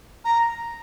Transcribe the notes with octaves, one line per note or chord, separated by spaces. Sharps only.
A#5